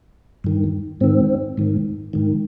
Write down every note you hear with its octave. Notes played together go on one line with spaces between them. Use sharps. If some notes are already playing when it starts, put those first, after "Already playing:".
G2 D#3
G#2 D#3 C4
G#2 D#3
G#2 D#3